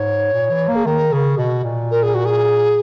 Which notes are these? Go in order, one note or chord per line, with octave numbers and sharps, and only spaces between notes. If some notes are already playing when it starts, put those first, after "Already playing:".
Already playing: G#2 C#5
A#2
E3
A#3
G#4
D#3 A#4
C#3 G#4
B2 F#4
A#2
A#4
G#4
F#4
G#4